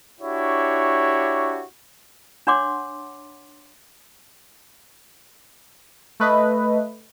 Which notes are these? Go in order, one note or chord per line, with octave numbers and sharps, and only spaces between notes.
D4 E4 F#4 G4 C#5
D4 C#5 F#5 C6 D6
A3 B4 D#5